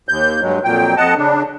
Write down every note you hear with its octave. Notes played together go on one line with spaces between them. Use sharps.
D#2 G6
G2 F#3 G#3
F2 A#2 F#3 G5
F2 D#5 F#5 A5
C#3 D4